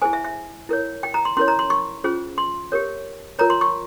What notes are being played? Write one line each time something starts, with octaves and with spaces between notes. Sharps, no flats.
E4 G#4 C5 G#5
E5
E5
E4 A#4 C#5
G5
A#5
C6
C#4 E4 A#4 C#5 C6
A#5
C6
C#6
C#4 F4 G#4 C5
C6
G4 A#4 C#5
F4 A#4 C#5 A#5
C6
C#6